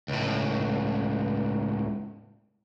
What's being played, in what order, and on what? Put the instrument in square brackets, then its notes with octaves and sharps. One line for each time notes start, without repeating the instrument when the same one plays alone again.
[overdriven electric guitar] C#2 A2